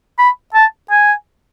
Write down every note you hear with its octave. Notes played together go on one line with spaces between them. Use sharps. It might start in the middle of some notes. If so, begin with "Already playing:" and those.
B5
A5
G#5